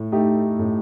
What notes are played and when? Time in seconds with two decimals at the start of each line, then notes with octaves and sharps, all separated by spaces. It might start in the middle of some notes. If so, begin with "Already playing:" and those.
Already playing: A2
0.12 A3 D#4 G4
0.59 A2